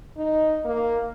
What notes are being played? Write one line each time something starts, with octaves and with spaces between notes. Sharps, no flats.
D#4
A#3